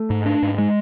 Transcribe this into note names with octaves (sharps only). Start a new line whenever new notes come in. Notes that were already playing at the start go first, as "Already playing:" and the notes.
Already playing: A3
G#2
D4
G#2
G#3